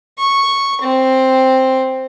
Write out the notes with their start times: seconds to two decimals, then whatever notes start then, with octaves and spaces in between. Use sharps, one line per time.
0.18 C#6
0.81 C4